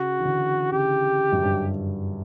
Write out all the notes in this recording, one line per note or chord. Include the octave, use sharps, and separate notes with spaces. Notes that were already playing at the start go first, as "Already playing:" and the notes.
Already playing: C#3 F#4
E3
D3
C#3 G4
F#2
G2